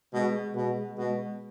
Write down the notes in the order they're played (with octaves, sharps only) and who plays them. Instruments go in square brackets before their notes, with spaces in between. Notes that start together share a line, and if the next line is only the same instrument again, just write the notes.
[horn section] B2 [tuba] G#3
[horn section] B2
B2